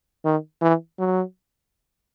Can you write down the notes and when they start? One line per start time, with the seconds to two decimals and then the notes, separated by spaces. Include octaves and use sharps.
0.25 D#3
0.62 E3
0.99 F#3